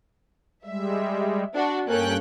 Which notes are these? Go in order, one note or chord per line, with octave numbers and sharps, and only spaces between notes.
G3 G#3 E5
D4 F#4
G2 A#3 C#4 A4 G5 F#6